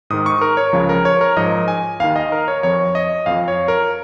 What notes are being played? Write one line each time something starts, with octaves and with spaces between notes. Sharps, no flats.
G#2 D#3 D#6
C#6
A#4
C#5
C#2 C#3 F3
A#4
C#5
A#4
G#2 F3 D#5
G#5
D#2 D#3 F5
D#5
A#4
C#5
F2 F3 C#5
D#5
F2 F3 F5
C#5
A#4